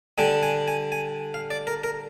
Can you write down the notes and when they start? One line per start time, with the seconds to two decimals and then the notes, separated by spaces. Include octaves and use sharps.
0.18 D3 G3 D4 G#5
0.43 G#5
0.68 G#5
0.92 G#5
1.34 F5
1.51 D5
1.67 A#4
1.84 A#4